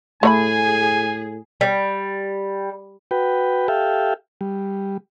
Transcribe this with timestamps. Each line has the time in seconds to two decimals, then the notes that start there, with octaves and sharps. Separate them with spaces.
0.23 A2 A3 G#4 C#5 G#5 B5
1.61 G3
3.11 F#4 B4 G5
3.68 G4 A4 E5 F5 G5
4.41 G3